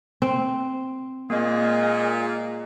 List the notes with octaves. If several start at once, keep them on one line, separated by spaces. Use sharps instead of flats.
C4
A#2 G#3 A#3 D#5